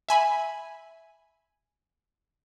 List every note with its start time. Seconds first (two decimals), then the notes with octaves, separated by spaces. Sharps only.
0.09 E5 G#5 B5